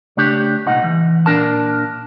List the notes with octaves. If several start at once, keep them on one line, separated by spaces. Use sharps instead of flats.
C#3 A3 D4 G4
C2 A#2 D#4 F#5
E3
A#2 E3 D4 A#4 A5